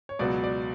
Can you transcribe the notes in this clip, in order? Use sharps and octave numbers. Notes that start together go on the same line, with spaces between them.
C#5
C#2 B2 F#3 B3 D5
D5